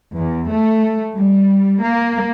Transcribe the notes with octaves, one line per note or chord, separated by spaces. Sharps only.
E2
A3
G3
A#3